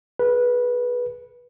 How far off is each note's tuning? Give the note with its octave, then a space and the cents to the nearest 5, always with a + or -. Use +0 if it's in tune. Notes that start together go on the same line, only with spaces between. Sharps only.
G#4 +25 B4 -15